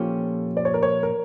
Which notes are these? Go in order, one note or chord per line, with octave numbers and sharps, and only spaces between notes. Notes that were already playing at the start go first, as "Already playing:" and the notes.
Already playing: A#2 F3 C#4 G4 A4
D5
C#5
A#4
C#5
A#4